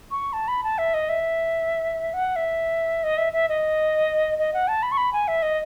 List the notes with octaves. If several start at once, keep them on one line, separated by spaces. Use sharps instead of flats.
C#6
A5
B5
A5
E5
D#5
E5
F#5
E5
D#5
E5
E5
D#5
D#5
F#5
A5
B5
C#6
B5
G#5
E5
D#5